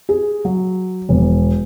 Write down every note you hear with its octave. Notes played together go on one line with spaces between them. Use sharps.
G#4
F#3
E1